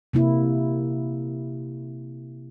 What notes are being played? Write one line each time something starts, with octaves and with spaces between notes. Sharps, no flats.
C3 A#3 E4